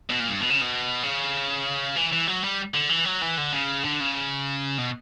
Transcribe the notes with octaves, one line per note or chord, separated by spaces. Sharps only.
B2
A#2
G2
B2
C#3
B2
C#3
E3
E3
F#3
G3
D3
E3
F#3
E3
D3
C#3
D3
C#3
B2